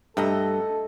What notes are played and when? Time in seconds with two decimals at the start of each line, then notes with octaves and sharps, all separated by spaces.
0.17 G2 A3 A4 D#5 A#5